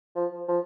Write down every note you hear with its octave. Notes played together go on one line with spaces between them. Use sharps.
F3
F3